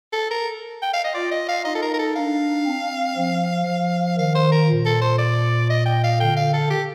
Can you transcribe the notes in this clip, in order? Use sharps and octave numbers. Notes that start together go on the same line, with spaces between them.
A4
A#4
G5
F5
D#5
F4 D5
D#5
F5
D#4 D#5
A4
A#4
A#4
A4
D4 F5
C4
F3
F3
D#3 F5
C5
A#4
A#2
A4
C5
D5
D#5
G5
F5
D3 G5
F5
A4
G4